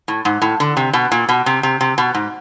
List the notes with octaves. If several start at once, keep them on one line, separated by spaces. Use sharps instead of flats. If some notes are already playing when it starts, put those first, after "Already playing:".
A2
G#2
A2
D3
C3
B2
A#2
B2
C3
C3
C3
B2
G#2